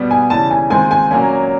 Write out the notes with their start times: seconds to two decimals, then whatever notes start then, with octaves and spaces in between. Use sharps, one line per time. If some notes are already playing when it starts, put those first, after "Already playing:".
Already playing: B2 G3 B3
0.11 G#5
0.30 C#3 E3 G3 A5
0.51 G#5
0.70 D#3 G#3 C4 F4 G#5
0.91 G#5
1.11 A#2 F#3 A#3 C#4 G#5